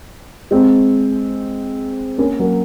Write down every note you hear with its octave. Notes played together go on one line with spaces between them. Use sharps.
G#3 C4
A#3 C#4
F#3 A#3